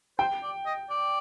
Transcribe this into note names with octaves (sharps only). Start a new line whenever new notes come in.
C5 G5
D5
D#5
D5